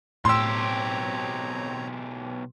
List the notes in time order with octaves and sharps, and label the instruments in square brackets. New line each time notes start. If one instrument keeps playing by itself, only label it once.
[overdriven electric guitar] B1 G4 [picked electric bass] A2 [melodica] C4 C#5 A#5 [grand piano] C6 E6